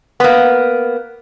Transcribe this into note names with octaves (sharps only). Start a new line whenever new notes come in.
A#3 B3